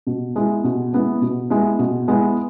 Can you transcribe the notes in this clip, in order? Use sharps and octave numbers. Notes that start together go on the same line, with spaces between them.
B2
G#3 B3 E4
B2
G#3 B3 E4
B2
G#3 B3 E4
B2
G#3 B3 E4